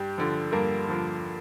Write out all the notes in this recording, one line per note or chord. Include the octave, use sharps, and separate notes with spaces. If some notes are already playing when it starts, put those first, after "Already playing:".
Already playing: G2 G3 G4
D3 F3
G2 A#3 A#4
D3 F3